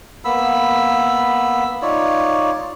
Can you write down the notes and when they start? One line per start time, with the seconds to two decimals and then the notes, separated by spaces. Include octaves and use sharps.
0.25 A#3 B3 B5 E6
1.82 D#4 F4 C#5 D5